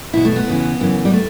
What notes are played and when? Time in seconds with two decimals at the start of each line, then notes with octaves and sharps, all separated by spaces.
0.14 E2 B2 E4
0.25 A3
0.36 B3
0.47 E2 C#3 E3
0.80 F#2 C#3 E3
1.05 G3
1.13 A3